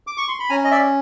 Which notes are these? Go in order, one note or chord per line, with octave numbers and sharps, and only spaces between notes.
D6
C#6
C6
B5
C#4 G#5 A#5
D#5
D5 E5